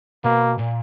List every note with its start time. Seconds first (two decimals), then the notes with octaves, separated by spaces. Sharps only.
0.24 B2 A#3
0.59 A#2